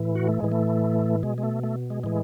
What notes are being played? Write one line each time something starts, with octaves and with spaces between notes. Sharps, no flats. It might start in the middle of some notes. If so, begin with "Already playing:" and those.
Already playing: A2 E3
F#4
A3
A2 E3 G#3
A3
B2 G#3
G#3
A3
A3
G#3
A2 E3 G#3